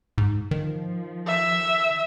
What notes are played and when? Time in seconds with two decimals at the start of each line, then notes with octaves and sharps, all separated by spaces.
0.18 G#2
0.51 D#3 F3
1.27 E5